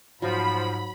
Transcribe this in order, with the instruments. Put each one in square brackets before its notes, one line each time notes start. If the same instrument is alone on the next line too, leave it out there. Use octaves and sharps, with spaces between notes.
[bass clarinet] G#2 [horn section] F3 [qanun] F#3 [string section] B5